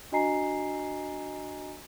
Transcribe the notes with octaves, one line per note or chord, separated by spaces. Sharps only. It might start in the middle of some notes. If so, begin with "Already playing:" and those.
D4 F#4 D#5 G#5 A#5 C7